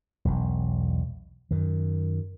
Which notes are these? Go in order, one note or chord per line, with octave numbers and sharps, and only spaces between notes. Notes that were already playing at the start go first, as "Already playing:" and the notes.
E1 B1
F#2 D#3